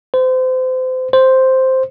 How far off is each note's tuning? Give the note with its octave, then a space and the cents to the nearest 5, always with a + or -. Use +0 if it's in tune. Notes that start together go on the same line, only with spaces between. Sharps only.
C5 -30
C5 +0